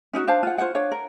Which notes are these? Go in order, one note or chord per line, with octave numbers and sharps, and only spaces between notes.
C#4 D#4 E4 F#4
D4 C5 F5 A5
F4 F#5
F4 C5 C#5 F#5
D4 C#5 F5
A#4